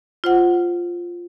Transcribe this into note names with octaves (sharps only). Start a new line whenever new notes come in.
F4 C5 F#5